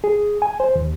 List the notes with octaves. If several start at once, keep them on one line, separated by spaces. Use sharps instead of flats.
G#4
G#5
C5
D#2